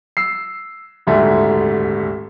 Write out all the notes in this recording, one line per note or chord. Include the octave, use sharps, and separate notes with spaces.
E6 C7
D#1 D2 G#2 A3